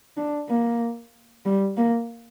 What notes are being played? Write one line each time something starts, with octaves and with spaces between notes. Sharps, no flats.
D4
A#3
G3
A#3